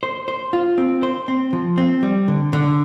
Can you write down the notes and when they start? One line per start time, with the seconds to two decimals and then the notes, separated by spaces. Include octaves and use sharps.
0.03 C5
0.28 C5
0.53 F4
0.78 C4
1.03 C5
1.28 C4
1.53 F3
1.78 C4
2.03 G3
2.28 D3
2.53 D3